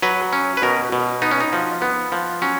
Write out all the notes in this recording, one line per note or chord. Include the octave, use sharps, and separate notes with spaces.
F#3 B4
C#4
B4
B2 A#4
B2
B3 D#4
C#4
D#4
F3
B3
F3
F#3 C#4